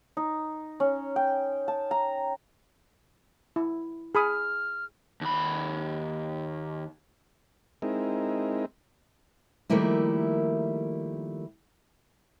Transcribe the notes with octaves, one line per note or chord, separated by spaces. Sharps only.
D#4
C#4
G5
A5
A#5
E4
G#4 B5 D#6 F6
D#2 B5
G#3 C4 D#4 E4 A#4
D#3 F3 G3 A3 A#3 E4